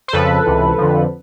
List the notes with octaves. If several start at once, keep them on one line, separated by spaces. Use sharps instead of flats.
C5
F2 C#3 F3 A4 B4
C#2 C3 E3
F2 D3 F3